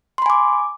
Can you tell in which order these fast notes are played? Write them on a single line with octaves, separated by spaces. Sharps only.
C6 B5 G#5 D6